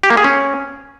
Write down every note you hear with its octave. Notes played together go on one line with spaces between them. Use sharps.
G4
A#3
G#4
C#4